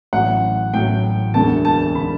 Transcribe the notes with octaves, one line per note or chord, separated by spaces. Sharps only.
A1 A2 F#3 F#5
A1 A2 F#3 G5
E1 D2 D3 A5
A5
D3 B5